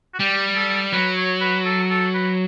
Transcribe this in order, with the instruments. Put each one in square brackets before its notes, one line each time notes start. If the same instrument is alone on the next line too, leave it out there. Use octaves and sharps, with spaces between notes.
[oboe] F#4
[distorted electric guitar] G3 [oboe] G4
[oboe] A4
[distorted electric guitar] F#3 [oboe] B4
[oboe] C#5
B4
A4
A4
B4